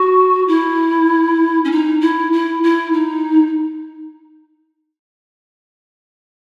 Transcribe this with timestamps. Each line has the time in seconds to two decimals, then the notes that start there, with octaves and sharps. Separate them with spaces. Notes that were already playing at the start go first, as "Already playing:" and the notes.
Already playing: F#4
0.47 E4
1.64 C#4
1.71 D#4
2.00 E4
2.32 E4
2.63 E4
2.92 D#4